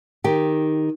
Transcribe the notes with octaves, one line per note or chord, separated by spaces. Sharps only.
D#3 G4